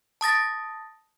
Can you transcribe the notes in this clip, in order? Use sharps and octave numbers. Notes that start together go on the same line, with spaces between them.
A5 D#6 A6 A#6